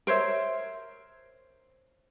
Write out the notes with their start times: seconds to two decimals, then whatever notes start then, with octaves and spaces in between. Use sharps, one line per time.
0.07 A#4 C5 C#5 E5